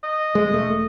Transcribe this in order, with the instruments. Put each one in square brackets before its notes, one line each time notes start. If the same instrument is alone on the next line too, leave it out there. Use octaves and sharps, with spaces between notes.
[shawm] D#5
[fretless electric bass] G#3
E1 A3